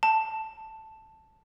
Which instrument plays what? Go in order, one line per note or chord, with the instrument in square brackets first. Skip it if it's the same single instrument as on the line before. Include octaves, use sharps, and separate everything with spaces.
[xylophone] A5